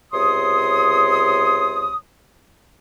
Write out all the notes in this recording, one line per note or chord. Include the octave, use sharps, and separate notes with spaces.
C#2 C3 C#5 C6 D#6